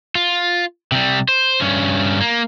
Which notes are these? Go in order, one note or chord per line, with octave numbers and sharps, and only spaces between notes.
F4
C3 G3
C5
G2 C#4
A#3